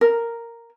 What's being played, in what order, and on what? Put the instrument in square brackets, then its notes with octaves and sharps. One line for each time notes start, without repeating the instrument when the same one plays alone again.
[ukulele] A#4